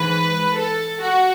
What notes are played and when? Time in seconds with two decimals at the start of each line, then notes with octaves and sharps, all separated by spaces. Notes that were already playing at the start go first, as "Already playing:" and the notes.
Already playing: G#2 E3 B4
0.59 A4
1.02 F#4